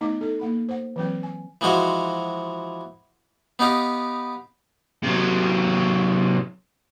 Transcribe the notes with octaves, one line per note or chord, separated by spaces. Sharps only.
A3 B3 D#4 D#5 D6
D#4 A4
A#3 F#5 B5
C5 F#5
E3 F#3 C4 G5
G#5
E3 F3 G#3 F#4 C5
B3 D#4 G4 F5
C3 F#3